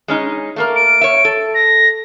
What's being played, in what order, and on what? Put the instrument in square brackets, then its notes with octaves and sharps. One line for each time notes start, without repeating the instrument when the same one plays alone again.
[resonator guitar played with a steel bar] G#3 C#4 D#4
A3 A#3 A#4
[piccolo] D7
[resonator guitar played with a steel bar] C#5 E5
A4
[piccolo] A#6